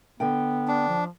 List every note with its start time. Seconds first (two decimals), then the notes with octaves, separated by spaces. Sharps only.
0.20 D3 B3 G5
0.68 D4
0.88 F3